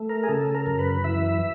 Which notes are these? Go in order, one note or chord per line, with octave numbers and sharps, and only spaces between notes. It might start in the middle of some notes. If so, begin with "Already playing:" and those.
Already playing: A3
A#4
G#4
C#3 A4
A#4
F#2
B4
E3 E5